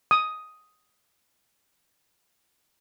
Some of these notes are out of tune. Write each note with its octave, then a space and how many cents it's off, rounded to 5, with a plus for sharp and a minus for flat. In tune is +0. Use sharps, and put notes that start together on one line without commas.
D#6 +5